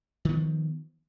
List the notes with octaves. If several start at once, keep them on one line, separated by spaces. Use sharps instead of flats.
D#3 F3 B3